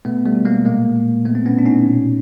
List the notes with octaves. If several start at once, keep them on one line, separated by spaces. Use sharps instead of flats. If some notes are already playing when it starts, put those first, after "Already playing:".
B2 A3 B3
G3 A3
B2
G#3 A#3
A#2 G#3 A#3
A#2
B2 A3 B3
C4
B3 C#4
B2 D4
C#4 D#4
A#2